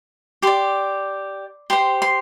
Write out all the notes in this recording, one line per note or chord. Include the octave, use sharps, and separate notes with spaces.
G4 D5 C6
G4 C5 C6
C6